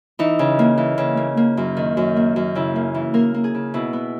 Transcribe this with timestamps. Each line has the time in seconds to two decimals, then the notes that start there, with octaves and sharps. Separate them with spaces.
0.19 E3 D#4
0.39 C#3
0.59 A#3
0.77 E3
0.98 C#3
1.17 A#3
1.37 A#3
1.57 F#2
1.77 D#3
1.97 F#2
2.16 A#3
2.36 F#2
2.55 C#3 E4
2.76 A#3
2.94 E3
3.14 A#3 A#4
3.34 A#3
3.44 G#4
3.54 C#3
3.74 B2 E4
3.93 B3